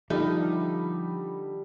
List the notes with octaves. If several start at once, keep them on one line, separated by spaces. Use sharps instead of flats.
D3 F3 G3 D#4 F4 G4 A4 E5